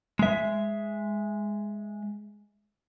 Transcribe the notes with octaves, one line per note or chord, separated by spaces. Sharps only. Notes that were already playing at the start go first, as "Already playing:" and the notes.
G#3 E5